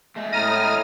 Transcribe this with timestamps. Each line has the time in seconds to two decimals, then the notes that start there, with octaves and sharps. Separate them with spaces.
0.16 G#3 A3
0.33 A2 A#5 D#6 F6